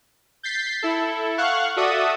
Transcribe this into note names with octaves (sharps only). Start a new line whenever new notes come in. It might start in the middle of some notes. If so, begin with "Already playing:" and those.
G6 A6 B6 C7
E4 A4
F5 F#5 C#6 F#6
F#4 A4 D5 E5 D#6